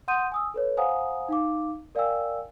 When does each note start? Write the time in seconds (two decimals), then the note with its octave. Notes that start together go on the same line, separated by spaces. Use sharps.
0.08 F#5 C6 D#6 G6 D#7
0.32 G#5 D#6 E6
0.54 A4 B4 C#5
0.77 C5 F5 F#5 G#5 A#5 D#6
1.29 D#4 F5 D6
1.95 A#4 D5 F5 G5 G#5 E6